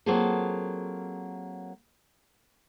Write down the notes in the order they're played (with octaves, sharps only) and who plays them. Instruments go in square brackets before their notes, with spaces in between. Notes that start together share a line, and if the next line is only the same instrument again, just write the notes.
[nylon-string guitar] F#3 A#3 C4 F4 G#4 A4